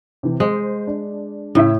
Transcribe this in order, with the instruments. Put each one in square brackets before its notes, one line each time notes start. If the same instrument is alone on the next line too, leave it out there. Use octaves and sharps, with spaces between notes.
[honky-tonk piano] C3 E3
[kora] G#3 [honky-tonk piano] C5
[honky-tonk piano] D4
[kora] A2 [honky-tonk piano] C#3 E4 E5